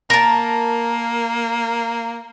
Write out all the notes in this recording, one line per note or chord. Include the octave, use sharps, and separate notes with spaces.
A#3 A#4 A5